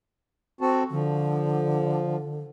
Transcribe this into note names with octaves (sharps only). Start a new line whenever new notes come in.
C4 F#4 A4
D3 F3